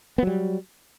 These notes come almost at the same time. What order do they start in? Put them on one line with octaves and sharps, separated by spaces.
B3 F#3 G3